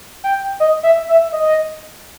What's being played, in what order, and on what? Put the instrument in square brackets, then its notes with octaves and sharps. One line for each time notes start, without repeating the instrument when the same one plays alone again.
[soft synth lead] G5
D#5
E5
E5
D#5